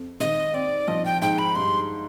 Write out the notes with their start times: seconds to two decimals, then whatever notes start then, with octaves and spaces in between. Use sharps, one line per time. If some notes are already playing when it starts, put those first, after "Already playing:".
Already playing: F2
0.20 G#1 D#5
0.54 C4 D5
0.88 F3 D#5
1.05 G5
1.22 G#2 G5
1.38 B5
1.55 G2 C6